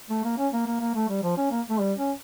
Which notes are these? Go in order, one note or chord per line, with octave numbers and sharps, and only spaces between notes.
A3
A#3
C#4
A#3
A#3
A#3
A3
G3
F3
C#4
A#3
A3
G3
C#4